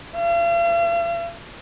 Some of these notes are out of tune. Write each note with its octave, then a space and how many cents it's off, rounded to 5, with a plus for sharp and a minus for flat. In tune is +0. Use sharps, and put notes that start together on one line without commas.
F5 -45